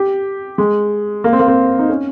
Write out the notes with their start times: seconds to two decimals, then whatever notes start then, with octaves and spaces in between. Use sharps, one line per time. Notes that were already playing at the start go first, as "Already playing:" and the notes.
Already playing: G4
0.58 G#3
1.24 A#3
1.33 C4
1.39 A#3
1.48 C4
1.79 D#4
1.90 C#4